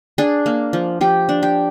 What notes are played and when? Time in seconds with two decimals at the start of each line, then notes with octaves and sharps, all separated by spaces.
0.18 D4 G#4
0.46 A#3
0.73 F3
1.01 F3 G4
1.29 D4
1.43 G4